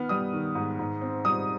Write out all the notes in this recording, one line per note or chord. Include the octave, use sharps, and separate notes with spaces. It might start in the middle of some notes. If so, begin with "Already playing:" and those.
Already playing: D#3 B3 F6
G3 D#6
D#3
G#2
G#2
C4
G3 D#6